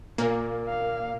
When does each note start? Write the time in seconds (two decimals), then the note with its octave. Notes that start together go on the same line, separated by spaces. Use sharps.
0.18 A#2 A#3 A#4
0.69 F5